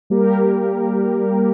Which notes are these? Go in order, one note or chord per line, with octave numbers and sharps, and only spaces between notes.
G3 A#3 G4 A#4